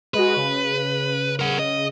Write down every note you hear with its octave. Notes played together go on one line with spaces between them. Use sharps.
G#3 F#4 B4
C#3
A#4 F#5
D#5